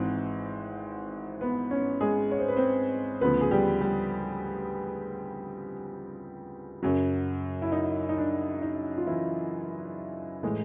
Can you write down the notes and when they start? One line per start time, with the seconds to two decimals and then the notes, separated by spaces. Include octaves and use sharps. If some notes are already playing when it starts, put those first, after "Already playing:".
Already playing: G#1 G#2 E3 C4
1.41 B3 B4
1.71 C#4 C#5
2.01 G#3 G#4
2.31 C#5
2.39 C5
2.48 B4
2.57 C4 C5
3.21 D2 C#3 F3 B3 B4
3.41 G#4
3.51 G3 G4
3.81 G3 G4
6.83 F#2 C#3 F#3
7.62 E4
7.72 D#4
8.09 D#4
8.18 D4
8.62 D#4
8.98 F4
9.07 E3 E4
10.43 A2 E3 G#3